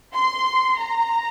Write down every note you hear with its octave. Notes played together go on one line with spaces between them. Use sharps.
C6
A#5